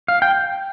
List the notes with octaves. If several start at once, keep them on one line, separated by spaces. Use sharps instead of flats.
F5
G5